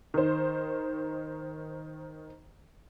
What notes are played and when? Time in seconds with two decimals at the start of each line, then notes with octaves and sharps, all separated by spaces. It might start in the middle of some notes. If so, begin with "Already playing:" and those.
0.14 D#3 C5